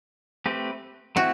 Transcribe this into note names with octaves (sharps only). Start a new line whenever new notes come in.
A3 C4 G4 B4
A3 C4 E4 F#4